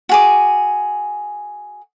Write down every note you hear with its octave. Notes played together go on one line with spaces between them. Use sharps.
F#4 G#4 D6